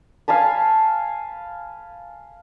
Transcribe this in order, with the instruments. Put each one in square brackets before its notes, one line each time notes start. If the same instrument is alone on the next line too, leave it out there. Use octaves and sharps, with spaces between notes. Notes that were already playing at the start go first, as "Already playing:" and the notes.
[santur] F5 G#5 A5 B5